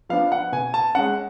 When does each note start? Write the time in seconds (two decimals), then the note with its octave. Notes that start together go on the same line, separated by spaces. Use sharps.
0.09 F3 B3 D4 F5
0.32 F#5
0.52 B2 G#5
0.74 A5
0.95 G#3 C#4 F#5